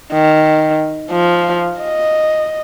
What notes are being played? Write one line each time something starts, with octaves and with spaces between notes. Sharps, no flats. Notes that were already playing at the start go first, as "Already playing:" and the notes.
D#3
F3
D#5